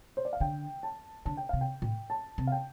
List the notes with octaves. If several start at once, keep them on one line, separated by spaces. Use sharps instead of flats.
C5
D5
F5
D3 G5
A5
D3 A5
G5
C3 F5
G5
A2
A5
C3
F5
G5